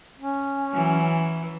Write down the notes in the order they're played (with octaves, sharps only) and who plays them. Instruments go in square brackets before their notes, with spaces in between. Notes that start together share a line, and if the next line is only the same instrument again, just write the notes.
[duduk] C#4
[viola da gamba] E3 F#3